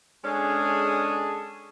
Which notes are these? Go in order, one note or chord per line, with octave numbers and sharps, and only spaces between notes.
G#3 C#4 D4 G#4 A4